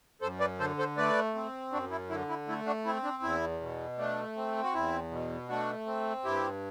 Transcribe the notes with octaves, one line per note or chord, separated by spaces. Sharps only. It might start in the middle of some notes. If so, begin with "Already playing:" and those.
F#2 A4 C5
B4 D5
D3 A4 C5
A4 C5
A3 B4 D5
C4
F#2 D4 F#4
E4
D3 E4
E4
A3 E4
D4 F#4
C4 E4
D4
E2 E4
B2
A3 D4
C4
F#4
E2 E4
B2
A3 D4 F#4
C4
G2 E4 G4